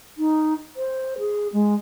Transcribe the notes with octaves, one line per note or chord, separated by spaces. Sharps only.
D#4
C5
G#4
G#3